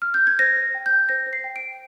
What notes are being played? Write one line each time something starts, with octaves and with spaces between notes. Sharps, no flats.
F6
G6
G#6
C5 A#6
C5
G5
G6
G5
C5 A#6
C5
C7
G5
D7
G5